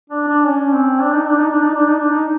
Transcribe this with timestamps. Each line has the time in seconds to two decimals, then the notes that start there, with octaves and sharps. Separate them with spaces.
0.10 D4
0.28 D4
0.47 C#4
0.74 C4
1.02 D4
1.14 D#4
1.27 D4
1.38 D#4
1.50 D4
1.62 D#4
1.75 D4
1.87 D#4
1.99 D4
2.12 D#4